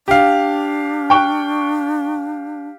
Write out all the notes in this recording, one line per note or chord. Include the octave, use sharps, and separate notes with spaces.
D4 G4 F5
G5 C#6 F#6